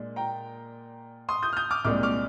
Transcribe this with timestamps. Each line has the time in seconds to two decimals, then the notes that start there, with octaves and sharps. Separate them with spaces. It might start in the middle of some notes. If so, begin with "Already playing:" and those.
Already playing: A#2 G#3 D4
0.16 G5 A#5
1.29 C6 D#6
1.43 D#6 G6
1.53 F6
1.57 D#6 G6
1.71 D6 F6
1.85 C2 A#2 G#3 D4 D6 F6
2.03 D6 F6